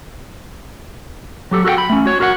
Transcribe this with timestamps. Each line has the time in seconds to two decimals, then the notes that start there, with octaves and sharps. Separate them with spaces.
1.51 F#3 G4 A4
1.64 F#4 A4 A#4 F#5 G5
1.78 B5
1.90 A3 C#4
2.06 F#4 C#5
2.20 F#4 A#4 C#5 F5 F#5